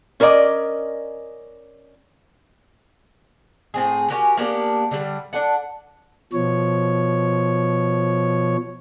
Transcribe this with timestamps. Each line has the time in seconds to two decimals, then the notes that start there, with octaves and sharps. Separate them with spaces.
0.20 C#4 A#4 C5 D5 D#5
3.74 A2 C4 G#4
4.10 F#4 G4 A#4 G#5
4.37 A#3 B3 D4 G4
4.91 D3 G3
5.33 D4 A4 F#5
6.33 B2 F3 C#5